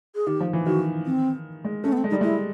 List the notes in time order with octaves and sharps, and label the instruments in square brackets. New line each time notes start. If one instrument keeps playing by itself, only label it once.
[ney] G#4
[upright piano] D#3 [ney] G4
[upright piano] F3
E3
[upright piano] D#3 [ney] F#4
[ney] C4
[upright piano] G#3
[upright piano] A3 [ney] C#4
[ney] B3
C4
[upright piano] G#3
[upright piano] G3 [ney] D#4
[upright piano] G#3 [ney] E4